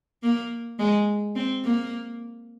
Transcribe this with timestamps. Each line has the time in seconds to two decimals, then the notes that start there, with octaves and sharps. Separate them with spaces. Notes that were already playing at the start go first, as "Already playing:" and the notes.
0.23 A#3
0.79 G#3
1.36 C4
1.64 A#3